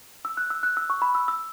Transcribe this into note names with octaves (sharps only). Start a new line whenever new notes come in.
E6
F#6
E6
F#6
E6
C#6
B5
E6
E6